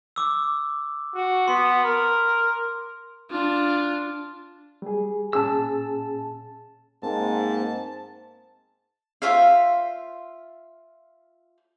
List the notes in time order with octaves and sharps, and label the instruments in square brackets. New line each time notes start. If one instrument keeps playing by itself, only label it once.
[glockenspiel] D6 E6
[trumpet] F#4
[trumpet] B3 [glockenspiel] C6
[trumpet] A#4
[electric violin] D4 F4
[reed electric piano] G3 G#4
[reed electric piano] A#2 C#4 G#4 [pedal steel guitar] A5 E6
[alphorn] G#2 [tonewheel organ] A#3 C4 [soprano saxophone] A5
[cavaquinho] F4 C5 E5 F5